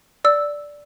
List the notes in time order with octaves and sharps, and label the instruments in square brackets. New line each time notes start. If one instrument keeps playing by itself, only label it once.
[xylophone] D5 E6